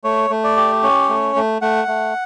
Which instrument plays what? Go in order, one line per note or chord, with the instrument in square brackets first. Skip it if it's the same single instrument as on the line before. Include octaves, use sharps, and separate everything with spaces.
[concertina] A3 C#5
A3
D5
G4
C#4 C#5
A3
A3
A3 F#5
A3